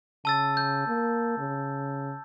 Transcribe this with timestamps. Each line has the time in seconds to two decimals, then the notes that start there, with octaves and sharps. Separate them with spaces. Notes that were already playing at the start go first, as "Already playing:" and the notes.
0.25 C#3 A5 E6 A6
0.57 G6
0.88 A#3
1.38 C#3